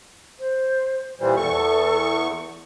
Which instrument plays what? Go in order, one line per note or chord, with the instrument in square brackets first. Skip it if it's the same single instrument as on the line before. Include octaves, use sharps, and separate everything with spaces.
[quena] C5
[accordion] A#2 E3 G3 [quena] C5
[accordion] E2 C#6 [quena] A4